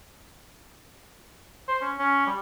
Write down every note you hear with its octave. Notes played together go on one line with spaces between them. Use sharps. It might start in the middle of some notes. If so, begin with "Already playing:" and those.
C5
C#4
C#4
G3